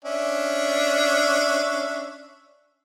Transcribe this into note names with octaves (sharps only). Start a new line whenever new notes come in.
C#4 D4 E5